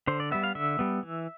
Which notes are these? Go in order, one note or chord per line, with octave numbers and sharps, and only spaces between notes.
D3 C5
D5
G3 B3 E5
F5
D3 E5
G3 B3
E3